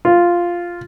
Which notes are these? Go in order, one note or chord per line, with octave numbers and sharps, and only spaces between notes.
F4